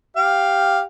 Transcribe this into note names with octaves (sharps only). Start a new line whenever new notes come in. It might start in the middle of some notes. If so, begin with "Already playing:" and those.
G4 F5